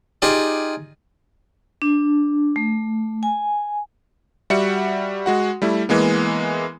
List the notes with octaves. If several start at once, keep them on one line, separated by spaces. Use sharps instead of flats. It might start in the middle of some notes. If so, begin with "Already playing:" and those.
D#4 F4 G4 G#4 D5
D4
A3
G#5
G3 F#4 E5 F#5 C#7
G#3 F#4 F#5
G3 A3 E4
E3 G#3 A#3 B3